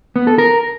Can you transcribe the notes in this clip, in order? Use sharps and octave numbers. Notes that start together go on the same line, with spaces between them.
B3
A4
A#4